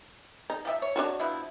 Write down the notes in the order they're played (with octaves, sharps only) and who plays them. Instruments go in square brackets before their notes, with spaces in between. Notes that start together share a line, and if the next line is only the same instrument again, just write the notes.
[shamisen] D#4
[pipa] F3 G4 E5
C#5
[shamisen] D4 F4 F#4
[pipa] B2 F3 E4